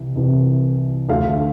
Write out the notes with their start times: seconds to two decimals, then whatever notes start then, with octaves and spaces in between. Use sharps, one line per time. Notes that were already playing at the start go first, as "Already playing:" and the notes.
Already playing: C2 C3 E3
0.16 C2 C3 E3
1.09 D2 D3 A3 F5